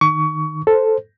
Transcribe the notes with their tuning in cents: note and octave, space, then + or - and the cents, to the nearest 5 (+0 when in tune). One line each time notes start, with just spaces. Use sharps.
D#3 -10 C#6 +25
A4 +0 C5 +0